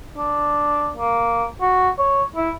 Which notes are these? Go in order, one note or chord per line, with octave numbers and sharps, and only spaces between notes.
D4
A#3
F#4
C#5
E4